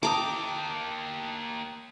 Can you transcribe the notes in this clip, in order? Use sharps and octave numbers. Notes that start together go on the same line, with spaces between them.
A#3 G5 A5 A#5 D6 D#6